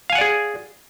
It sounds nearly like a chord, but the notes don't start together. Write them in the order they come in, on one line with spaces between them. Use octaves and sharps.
F5 G#5 F#5 D5 G#4